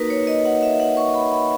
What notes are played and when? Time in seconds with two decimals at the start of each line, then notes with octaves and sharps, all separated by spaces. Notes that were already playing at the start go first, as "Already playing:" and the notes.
Already playing: A#3 D#4 F#4 A#4 B4
0.10 C#5
0.27 D#5
0.45 F#5
0.63 E5
0.80 F#5
0.97 C#6
1.14 B5
1.32 B5